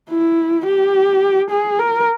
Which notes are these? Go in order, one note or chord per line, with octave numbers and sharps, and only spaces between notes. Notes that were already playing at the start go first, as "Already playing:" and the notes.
E4
G4
G#4
A#4